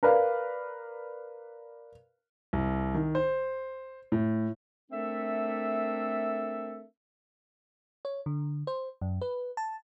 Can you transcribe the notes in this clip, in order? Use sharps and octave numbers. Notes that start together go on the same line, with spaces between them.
A#4 B4 D5 F5
C2
D#3
C5
A2
A3 C4 D4 A4 A#4 E5
C#5
D3
C5
F#2
B4
A5